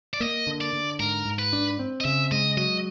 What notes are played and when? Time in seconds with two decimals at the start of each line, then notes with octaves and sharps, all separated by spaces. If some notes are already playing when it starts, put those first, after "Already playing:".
0.14 D5
0.20 A#3 D#5
0.47 D3
0.61 D5
0.73 D3
1.00 G#2 A#4
1.26 G#2
1.39 B4
1.53 D4
1.79 C4
2.01 D#5
2.05 C#3 E5
2.32 G#3 D#5
2.57 F#3 D#5